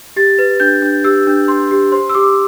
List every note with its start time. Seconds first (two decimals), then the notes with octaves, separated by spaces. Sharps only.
0.16 G4 A6
0.39 B4
0.60 D4 G6
0.82 D4
1.04 G4 E6
1.27 D4
1.48 D4 C6
1.71 G4
1.92 C5 C6
2.10 E6
2.14 G4 D6